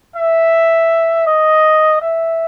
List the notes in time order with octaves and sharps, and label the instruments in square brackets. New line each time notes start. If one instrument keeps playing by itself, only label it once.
[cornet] E5
D#5
E5